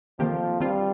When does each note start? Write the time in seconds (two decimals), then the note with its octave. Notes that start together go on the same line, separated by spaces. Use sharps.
0.19 F2 C3 D#3 F3 A#3 G4
0.60 G2 D#3 G3 C4 F4